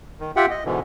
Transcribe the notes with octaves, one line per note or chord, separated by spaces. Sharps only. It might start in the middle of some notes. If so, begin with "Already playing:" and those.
D#3
F4 G4 E5 F#5 G5
D#5
G#2 B2 D3 E3